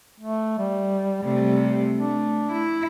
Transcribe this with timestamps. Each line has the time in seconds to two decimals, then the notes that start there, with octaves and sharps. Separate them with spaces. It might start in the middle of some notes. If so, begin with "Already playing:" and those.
0.20 A3
0.58 G3
1.23 C3 G3 A3
1.98 A3 D4
2.52 E4